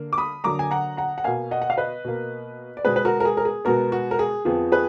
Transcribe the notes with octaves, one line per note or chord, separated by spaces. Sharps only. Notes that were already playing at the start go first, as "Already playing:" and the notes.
Already playing: D3 A#3
D6
B5 D#6
D3 F#3 A#3 A#5 D6
G#5
F#5 A#5
F#5 A#5
F#5
B2 A#3 F5 G#5
D#5 F#5
F#5
F5
B4 D#5
B2 A#3
D5
B2 G#3 B3 G#4 B4
B4
F#4 A#4
A#4
G#4
A#4
G#4
B2 G#3 B3 F#4 A#4
F#4
A#4
G#4
F2 F3 B3 G#4
G#4 B4